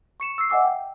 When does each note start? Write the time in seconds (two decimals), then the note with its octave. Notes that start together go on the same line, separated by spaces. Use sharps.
0.20 C#6 C#7 E7
0.38 E6 C7
0.50 D#5 E5 F#5 G#5 D6 E6
0.65 G5